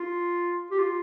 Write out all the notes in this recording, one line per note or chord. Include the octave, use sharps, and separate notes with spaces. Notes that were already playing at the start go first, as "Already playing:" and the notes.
Already playing: F4
G4
F4